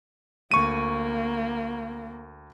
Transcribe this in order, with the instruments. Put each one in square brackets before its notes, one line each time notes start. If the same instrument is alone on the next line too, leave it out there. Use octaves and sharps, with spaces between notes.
[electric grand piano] D2 C#6 D#7 [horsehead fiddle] A#3